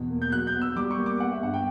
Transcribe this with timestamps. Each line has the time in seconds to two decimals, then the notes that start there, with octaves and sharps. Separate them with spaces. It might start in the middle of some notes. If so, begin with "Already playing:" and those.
Already playing: E2 B2
0.10 A#3
0.22 G6
0.32 F#3 F#6
0.47 G6
0.54 B3
0.62 E6
0.76 G3 D6
0.91 C#6
0.98 A#3
1.06 D6
1.20 B3 F#5
1.32 E5
1.42 G2 F#5
1.54 G5